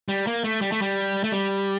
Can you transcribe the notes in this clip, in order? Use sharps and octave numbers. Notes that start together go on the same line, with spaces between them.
G3
A#3
A3
G3
A3
G3
A3
G3